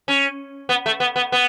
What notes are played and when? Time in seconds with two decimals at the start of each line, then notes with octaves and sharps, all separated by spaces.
0.08 C#4
0.69 B3
0.86 A3
1.00 B3
1.16 B3
1.32 B3